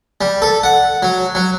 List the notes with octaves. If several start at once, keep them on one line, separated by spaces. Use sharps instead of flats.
G3
A4
F#5
F#3
F#3